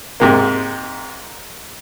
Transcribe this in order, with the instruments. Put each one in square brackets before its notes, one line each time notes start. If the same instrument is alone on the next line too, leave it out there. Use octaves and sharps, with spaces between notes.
[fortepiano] G#2 C3 A#3